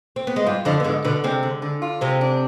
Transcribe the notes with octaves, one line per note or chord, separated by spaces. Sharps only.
C4
B3
G#3
G2 G3 F4
F2 D3 F3
B3
G#2 D3 G#3
B2 D3 B3
C3 G#3 C4
D3
D3
F4
C3 G#3 C4
D4